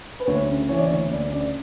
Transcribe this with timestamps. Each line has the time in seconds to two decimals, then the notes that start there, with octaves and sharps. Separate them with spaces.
0.19 B4
0.27 D2 C#5
0.49 C#3
0.69 E3 C#5
0.78 D5
0.87 C#5
0.90 D2
1.11 D2 D5
1.32 C#3 D5